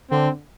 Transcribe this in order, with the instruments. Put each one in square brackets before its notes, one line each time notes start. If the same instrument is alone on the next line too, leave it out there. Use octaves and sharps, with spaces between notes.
[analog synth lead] D3 [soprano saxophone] C4